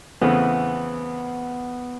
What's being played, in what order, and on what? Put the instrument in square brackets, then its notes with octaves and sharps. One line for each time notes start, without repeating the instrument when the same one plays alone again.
[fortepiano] E2 C#3 E3 A3 C4 [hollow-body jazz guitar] B3